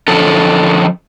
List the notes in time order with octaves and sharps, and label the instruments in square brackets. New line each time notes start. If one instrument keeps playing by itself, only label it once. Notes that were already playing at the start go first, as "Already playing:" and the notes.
[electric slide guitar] D3 F3 C#4 A4